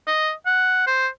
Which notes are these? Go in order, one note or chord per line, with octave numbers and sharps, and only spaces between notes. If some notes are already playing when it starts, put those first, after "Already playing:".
D#5
F#5
C5